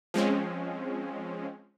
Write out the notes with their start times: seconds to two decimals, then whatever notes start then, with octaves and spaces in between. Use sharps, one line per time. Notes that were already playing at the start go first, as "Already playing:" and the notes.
0.14 F3 G#3 C4 C#4